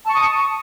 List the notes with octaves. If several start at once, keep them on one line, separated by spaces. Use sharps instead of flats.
A5 C#6 D#6